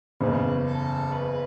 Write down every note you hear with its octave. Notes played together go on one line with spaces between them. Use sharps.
F#1 E2 C#3 B4
A4
B4